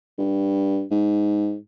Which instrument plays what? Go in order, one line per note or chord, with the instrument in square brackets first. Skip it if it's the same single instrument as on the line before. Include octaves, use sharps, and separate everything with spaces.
[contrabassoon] G2
G#2